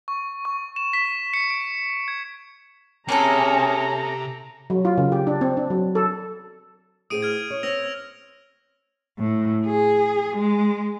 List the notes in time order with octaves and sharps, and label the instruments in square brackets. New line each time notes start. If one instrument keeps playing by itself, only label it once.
[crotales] C#6
C#6
E7
B6
C#7
D7
G#6
[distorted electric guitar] C3 [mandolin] A#3 E4 A4 [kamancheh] C#4 G#4 [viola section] A#5
[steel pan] F#3
F4
C#3
G4
D4
C4
D4
F#3
A4
[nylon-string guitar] A2 G#4 C5 [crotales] D#6 D7 D#7
[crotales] F6 G#6
[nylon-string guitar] C#5
[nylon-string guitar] C4 C5 C#5 [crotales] E6 A#6 F7
[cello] A2
G#4
G#3